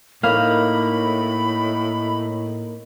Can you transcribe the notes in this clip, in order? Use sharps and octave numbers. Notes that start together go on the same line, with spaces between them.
A2 A#3 D#4 F5 B5